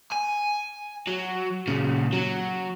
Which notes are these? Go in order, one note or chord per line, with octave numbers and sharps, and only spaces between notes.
G#5
F#3
A#2 C#3
F#3